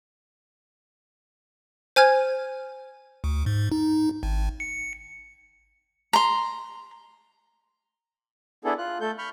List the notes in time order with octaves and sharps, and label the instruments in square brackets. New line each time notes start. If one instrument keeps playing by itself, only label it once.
[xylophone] C5 G#5 F6 G#6
[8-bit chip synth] D2
G#2
D#4
G#1
C#7
[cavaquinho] A#5 C6
[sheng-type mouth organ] B3 D4 E4 G#4 A4
F4 F#6
A3 A4 G6
B5 C#6 F6 G6